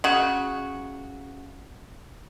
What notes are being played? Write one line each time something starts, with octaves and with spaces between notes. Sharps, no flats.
C#3 F#4